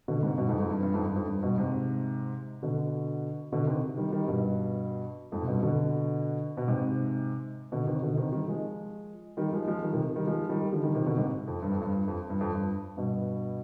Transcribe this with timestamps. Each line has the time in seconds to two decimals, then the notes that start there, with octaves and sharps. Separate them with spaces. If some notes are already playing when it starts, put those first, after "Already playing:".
0.08 B2 D3
0.23 G#2 C3
0.38 G2 B2
0.49 F2 G#2
0.60 F2 G#2
0.71 G2
0.83 G2
0.94 F2 G#2
1.06 G2
1.16 F2
1.28 G2
1.43 G2 B2
1.58 G#2 C3
2.62 B2 D3
3.52 B2 D3
3.67 C3 D#3
3.97 D#3 G3
4.12 D#3 G3
4.27 G2 B2
5.32 F2 G#2
5.42 C3
5.48 G2 B2
5.62 B2 D3
6.57 B2
6.68 G#2 C3
7.72 B2 D3
7.87 C3 D#3
8.02 B2 D3
8.17 C3 D#3
8.32 D#3 G3
8.47 F3 G#3
9.37 D#3 G3
9.53 F3 G#3
9.67 F3 G#3
9.82 D#3 G3
9.93 C3 D#3
10.16 D#3 G3
10.27 F3 G#3
10.49 D#3 G3
10.72 D3 F3
10.84 D#3 G3
10.95 C3 D#3
11.06 B2 D3
11.17 G#2 C3
11.47 F2
11.62 G2
11.71 F2
11.82 G2
12.08 F2
12.30 G2
12.41 F2
12.52 G2
12.97 G2 B2